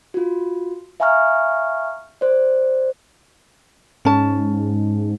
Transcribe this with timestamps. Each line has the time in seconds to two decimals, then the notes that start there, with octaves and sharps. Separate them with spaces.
0.14 F4 F#4
1.00 E5 F5 G#5 A#5 C#6 F6
2.21 C5 D5
4.05 G#2 C#4 A5